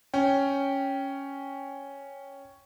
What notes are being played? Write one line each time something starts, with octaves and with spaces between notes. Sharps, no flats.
C#4 G5